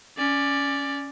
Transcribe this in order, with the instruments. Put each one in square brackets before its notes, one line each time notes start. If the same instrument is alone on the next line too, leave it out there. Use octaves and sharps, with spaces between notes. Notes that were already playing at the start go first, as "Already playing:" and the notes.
[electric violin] C#4 D5